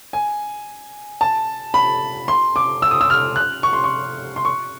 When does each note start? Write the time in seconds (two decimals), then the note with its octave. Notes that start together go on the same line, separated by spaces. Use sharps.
0.13 G#5
1.21 A5
1.74 B5
2.28 C6
2.56 D6
2.82 E6
2.91 D#6
3.01 E6
3.10 F6
3.36 F#6
3.63 C#6
3.73 C6
3.84 C#6
4.36 C6
4.45 C#6